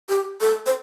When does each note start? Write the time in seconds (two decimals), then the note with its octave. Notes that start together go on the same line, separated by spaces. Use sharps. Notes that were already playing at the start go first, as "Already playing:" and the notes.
0.09 G4
0.41 A4
0.66 C5